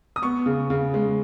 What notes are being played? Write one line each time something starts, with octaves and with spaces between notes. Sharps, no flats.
D#6
B3 C#6
C#3
C#3
G#3